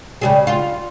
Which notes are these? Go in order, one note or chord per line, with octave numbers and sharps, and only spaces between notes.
C#3 G3 G#4
F4